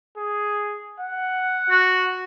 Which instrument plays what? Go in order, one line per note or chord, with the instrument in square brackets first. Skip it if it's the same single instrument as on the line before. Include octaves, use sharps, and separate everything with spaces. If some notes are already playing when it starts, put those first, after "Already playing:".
[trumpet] G#4
F#5
[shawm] F#4